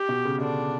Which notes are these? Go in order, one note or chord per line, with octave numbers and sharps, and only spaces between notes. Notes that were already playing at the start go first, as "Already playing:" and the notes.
Already playing: G4
B2
C#3
D3 D4